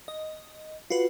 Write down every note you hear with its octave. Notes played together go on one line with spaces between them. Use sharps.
D#5
F4 F#4 B4